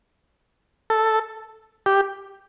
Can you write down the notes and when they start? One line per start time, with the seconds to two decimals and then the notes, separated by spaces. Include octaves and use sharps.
0.90 A4
1.86 G4